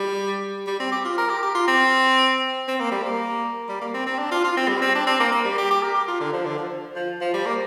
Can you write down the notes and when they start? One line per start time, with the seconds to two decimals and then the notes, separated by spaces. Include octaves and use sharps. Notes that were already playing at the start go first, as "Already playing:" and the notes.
Already playing: G3
0.67 G3
0.80 C4
0.92 G4
1.05 F4
1.18 A#4
1.30 G4
1.42 G4
1.55 F4
1.68 C4
2.68 C4
2.80 A#3
2.91 G3
3.03 A#3
3.69 G3
3.81 A#3
3.94 C4
4.07 C4
4.19 D4
4.31 F4
4.44 F4
4.57 C4
4.69 G3
4.82 C4
4.95 D4
5.07 C4
5.20 A#3
5.32 A#3
5.45 G3
5.58 G4
5.71 G4
5.82 A#4
5.95 G4
6.08 F4
6.20 D3
6.33 F3
6.45 D3
6.58 F3
6.95 F3
7.21 F3
7.34 G3
7.46 A#3